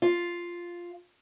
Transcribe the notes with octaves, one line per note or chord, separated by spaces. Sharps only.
F4